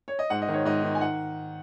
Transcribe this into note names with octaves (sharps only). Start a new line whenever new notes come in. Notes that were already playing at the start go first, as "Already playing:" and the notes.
C#5
D#5
G#2 F#5
D#5
D#3
C#5
G#2 D#5
D#3
G#5
D#3 F#5